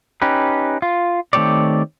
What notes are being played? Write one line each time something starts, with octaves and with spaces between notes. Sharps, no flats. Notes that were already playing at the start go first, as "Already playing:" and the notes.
C#4 D#4 G4 B4
F4
D#3 A3 C4 G4 C#5 D5